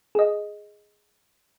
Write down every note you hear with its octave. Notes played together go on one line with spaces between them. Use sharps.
G#4 D#5